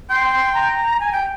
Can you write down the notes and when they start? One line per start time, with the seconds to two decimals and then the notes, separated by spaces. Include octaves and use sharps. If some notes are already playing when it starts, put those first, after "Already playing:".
0.10 G5 C6
0.55 A#5
1.00 G#5
1.12 G5